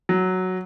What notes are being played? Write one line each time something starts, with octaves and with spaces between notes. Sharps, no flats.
F#3